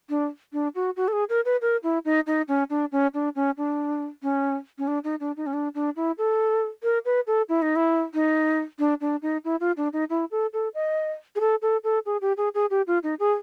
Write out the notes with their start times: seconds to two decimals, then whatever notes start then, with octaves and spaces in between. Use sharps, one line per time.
0.09 D4
0.53 D4
0.75 F#4
0.96 F#4
1.08 A4
1.13 G#4
1.29 A#4
1.45 B4
1.61 A#4
1.83 E4
2.05 D#4
2.27 D#4
2.48 C#4
2.70 D4
2.92 C#4
3.14 D4
3.36 C#4
3.57 D4
4.23 C#4
4.78 C#4
4.87 D4
5.04 D#4
5.20 D4
5.37 D#4
5.46 C#4
5.53 D4
5.75 D4
5.96 E4
6.18 A4
6.83 A#4
7.05 B4
7.27 A4
7.49 E4
7.62 D#4
7.76 E4
8.14 D#4
8.79 D4
9.01 D4
9.22 D#4
9.44 E4
9.60 F4
9.77 D4
9.93 D#4
10.10 E4
10.31 A4
10.53 A4
10.74 D#5
11.35 G#4
11.40 A4
11.62 A4
11.84 A4
12.06 G#4
12.21 G4
12.37 G#4
12.54 G#4
12.70 G4
12.87 F4
13.03 D#4
13.19 G#4